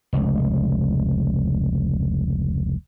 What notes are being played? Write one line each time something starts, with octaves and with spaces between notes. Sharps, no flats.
F1 C#2